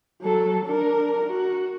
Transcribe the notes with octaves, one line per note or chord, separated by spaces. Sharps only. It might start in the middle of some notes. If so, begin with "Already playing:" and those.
F#3 A4
D4 A#4
F#4